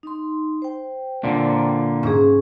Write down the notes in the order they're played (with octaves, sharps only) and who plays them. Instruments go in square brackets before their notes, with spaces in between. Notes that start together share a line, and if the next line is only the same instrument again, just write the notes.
[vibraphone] D#4 C6
C5 G5
[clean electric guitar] A#2 D3
[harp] G#2 [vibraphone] C#4 G#4